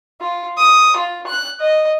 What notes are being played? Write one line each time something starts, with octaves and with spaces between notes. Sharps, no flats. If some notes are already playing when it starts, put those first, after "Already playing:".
F4
D#6
F4
F#6
D#5